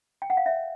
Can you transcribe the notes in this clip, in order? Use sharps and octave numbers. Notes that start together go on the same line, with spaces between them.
G5
F#5
F5
C#5 E5